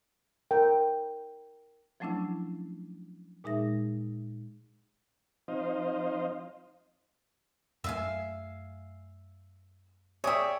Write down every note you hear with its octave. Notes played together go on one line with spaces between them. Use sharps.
A#4 G5
F3 F#3 A3 C#4 D4 E4
A#2 G#3 D#4 G#4 E5 A#6
F3 C4 D#4 C5 D#5 F5
F#2 A3 E5 F5 G#5
G#4 C#5 D5 E5 G5